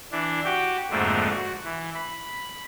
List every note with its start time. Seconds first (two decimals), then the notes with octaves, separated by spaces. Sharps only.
0.12 E3 D4
0.44 F#4 G4 G5
0.91 F2 G#2 D3 F3 A3 A#3
1.32 F#4
1.64 E3
1.94 B5